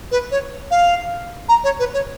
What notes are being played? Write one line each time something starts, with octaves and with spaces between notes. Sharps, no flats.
B4
C#5
F5
A#5
C#5
B4
C#5